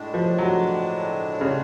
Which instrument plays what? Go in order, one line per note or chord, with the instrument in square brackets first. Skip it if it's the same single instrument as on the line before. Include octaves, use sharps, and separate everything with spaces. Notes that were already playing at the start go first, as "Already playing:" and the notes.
Already playing: [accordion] A2 G#3 D4
[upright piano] F3
F#3
C#3